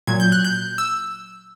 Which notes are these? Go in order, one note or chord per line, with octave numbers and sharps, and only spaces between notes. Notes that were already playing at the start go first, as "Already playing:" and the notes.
A#2 F#3 G#6
G6
F#6
G6
E6